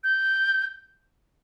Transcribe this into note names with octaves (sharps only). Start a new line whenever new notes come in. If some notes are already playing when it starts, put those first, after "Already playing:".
G6